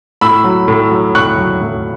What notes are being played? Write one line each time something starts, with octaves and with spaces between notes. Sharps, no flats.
A2 B5 E6
F#3
A2
F#3
A2 C#6 F#6
F#3
A2